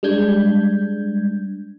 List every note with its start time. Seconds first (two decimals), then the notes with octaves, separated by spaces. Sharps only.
0.03 G3 G#3 D4 G6 G#6